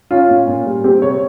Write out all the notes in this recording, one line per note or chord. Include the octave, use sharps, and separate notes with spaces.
C#4 F4
A#2
A#2
G3
C4 G4
C3 C#5